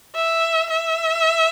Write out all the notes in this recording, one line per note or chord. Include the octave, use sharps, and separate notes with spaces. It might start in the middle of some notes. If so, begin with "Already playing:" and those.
E5
E5